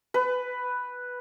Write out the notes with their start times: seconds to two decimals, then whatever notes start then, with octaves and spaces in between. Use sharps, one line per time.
0.14 B4